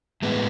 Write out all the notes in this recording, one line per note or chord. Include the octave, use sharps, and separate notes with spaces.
A2 G#3 B3